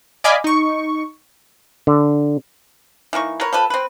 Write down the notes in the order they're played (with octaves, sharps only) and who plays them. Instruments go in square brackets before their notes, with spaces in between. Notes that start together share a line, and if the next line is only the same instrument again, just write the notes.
[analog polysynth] D5 D#5 F5 G#5 B5 D6
D#4 C#6
[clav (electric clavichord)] D3
[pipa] E3 A#3 D#4 C#6
A#4 B4 C#5
F3 A4 B4
C4 B4